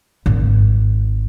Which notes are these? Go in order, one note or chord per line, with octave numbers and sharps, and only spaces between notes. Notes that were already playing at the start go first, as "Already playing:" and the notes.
G#1